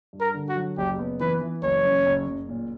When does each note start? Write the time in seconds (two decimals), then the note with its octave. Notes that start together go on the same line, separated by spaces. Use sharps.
0.13 G2
0.20 A#4
0.34 D3
0.49 F#4
0.56 F#3
0.78 F#1 G4
0.99 B3
1.20 E3 B4
1.41 E3
1.62 F#1 C#5
1.85 F#2
2.06 F#1
2.27 F#1
2.49 A#2